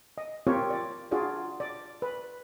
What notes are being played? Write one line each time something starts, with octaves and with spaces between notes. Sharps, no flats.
D#5
C4 F4 G4 A#4 C#5
D5
D4 F4 F#4 G#4 D5
D5
B4